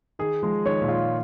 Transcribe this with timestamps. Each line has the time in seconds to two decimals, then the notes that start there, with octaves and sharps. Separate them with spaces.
0.19 D#3 G#4
0.42 F3 G#3
0.65 D#3 C#5
0.81 A#2
0.88 F4